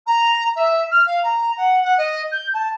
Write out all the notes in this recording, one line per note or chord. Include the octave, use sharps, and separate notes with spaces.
A#5
E5
F6
F5
A#5
F#5
F#5
D#5
G6
A5